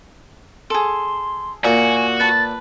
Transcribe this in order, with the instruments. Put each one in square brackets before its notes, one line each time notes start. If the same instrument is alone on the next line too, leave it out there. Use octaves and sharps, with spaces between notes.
[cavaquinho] G#4 A4 [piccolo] C6
[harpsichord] A#2 [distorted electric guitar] F#4 [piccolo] G#5
[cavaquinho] B4 A5 [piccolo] A6